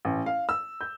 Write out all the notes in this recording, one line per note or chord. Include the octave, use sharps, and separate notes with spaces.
A1
F5
E6
G6